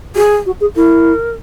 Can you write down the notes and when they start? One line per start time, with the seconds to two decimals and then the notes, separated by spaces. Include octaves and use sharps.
0.15 F#4 G#4
0.46 F#4
0.60 G#4
0.75 E4 A#4